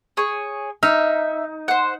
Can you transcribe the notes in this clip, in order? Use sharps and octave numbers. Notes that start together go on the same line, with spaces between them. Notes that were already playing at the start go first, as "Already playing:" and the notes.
G#4 C#5
D#4 E5 F6
C5 F#5